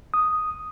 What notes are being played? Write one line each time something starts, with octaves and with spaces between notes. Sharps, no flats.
D#6